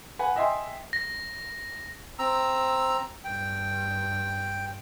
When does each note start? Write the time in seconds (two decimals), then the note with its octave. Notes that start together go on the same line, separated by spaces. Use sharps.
0.19 B4 F#5 G#5
0.36 D#5 E5 G5 G#5 C6
0.93 A#6
2.19 C4 A#5 E6
3.24 G2 G5